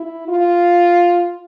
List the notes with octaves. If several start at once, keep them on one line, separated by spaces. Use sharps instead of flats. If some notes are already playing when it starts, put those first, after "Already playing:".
Already playing: E4
F4